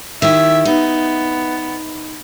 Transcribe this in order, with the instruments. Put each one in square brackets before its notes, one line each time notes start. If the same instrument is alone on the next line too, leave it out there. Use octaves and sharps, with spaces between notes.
[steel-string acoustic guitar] D#3 E4 G4 [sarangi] E5
[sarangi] B3 [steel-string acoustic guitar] D#4